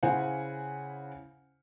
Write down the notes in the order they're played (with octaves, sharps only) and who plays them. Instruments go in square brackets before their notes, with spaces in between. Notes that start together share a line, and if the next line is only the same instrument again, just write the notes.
[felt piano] C#3 E4 C5 F#5 G#5